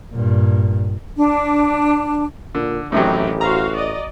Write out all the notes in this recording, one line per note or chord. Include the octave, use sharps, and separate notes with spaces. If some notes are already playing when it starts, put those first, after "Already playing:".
G2 A#2
D4
A#2 D3
A1 A2 C3 D#3 E3 F#3 G4
F#4 C5 F5 A#5
D5 D#5